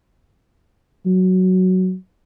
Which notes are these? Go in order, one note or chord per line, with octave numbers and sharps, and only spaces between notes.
F#3